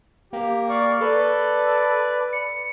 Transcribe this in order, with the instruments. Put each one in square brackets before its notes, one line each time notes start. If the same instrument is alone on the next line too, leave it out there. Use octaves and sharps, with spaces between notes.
[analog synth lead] A#3 [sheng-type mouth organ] G4
[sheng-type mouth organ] D5 F5 C#6
[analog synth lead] A4 [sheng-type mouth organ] B4 D5
[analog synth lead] C#7